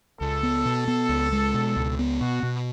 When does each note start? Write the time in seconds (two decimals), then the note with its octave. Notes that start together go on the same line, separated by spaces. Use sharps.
0.20 C#2 A4
0.43 B3
0.65 B2
0.88 B3
1.09 C#2
1.32 G#3
1.54 B2
1.76 C#2
1.99 B3
2.21 B2 F#4
2.43 B2